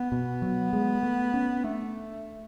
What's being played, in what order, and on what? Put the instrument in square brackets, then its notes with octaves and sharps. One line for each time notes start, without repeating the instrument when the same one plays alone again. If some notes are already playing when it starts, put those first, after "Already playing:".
Already playing: [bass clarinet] B3
[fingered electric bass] B2
F#3
G#3
A3
C#4
[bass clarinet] A3 [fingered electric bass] D4